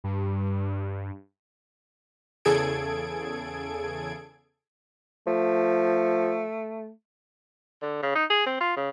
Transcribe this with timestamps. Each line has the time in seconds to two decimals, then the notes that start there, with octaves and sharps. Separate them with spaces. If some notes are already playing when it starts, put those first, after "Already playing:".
0.04 G2
2.45 E2 C#3 G#4 A4 G#6 D7
5.27 F3 A3
7.82 D3
8.03 C#3
8.15 D#4
8.30 G#4
8.46 C4
8.61 F4
8.76 C#3